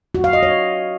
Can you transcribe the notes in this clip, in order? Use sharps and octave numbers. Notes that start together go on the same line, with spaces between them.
F#4
F5
D#5
C#5